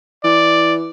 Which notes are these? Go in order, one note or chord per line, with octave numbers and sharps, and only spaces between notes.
E3 D5